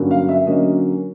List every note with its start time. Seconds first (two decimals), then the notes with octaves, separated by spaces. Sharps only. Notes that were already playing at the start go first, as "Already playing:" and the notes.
Already playing: G2 D3 F#3 A#3 C#4
0.11 F5
0.29 E5
0.47 D3 F#3 A#3 C#4 D#5